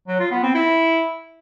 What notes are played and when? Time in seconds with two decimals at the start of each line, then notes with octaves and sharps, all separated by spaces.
0.08 F#3
0.20 F4
0.31 B3
0.43 C4
0.55 E4